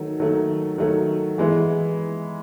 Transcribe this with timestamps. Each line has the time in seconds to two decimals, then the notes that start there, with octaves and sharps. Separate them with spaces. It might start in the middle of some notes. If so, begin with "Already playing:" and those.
Already playing: D#3 F#3 A3
0.20 D#3 F#3 A3
0.78 D#3 F#3 A3
1.38 E3 G#3 B3 E4